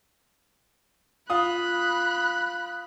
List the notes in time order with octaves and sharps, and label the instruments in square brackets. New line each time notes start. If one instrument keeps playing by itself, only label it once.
[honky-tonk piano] F4 D#6 [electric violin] B5 F#6